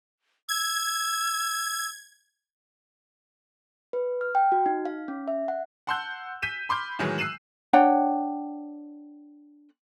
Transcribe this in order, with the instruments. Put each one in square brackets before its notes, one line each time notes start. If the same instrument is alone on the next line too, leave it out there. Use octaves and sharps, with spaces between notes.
[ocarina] E6 [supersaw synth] G#6
[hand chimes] B4
F6
G5
F#4
D#4
F5
C#4
E5
F#5
[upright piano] F#5 A5 C6 E6 F#6 G6
G6 B6 D#7 E7
B5 C6 D6 F6 G6
A2 D#3 E3 F#3 G#3
E6 F#6 C7 D#7 E7 F#7
[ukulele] D4 C#5 F#5 G5